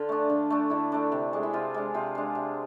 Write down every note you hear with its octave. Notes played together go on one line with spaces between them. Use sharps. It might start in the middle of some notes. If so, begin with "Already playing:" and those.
Already playing: D3 F4
A3 D4
D3
A3 D4
D3 E4
A3 D4
C3
G#3 D4
E4
C3 F4
G#3 D4
C3 F4
G#3 D4
C3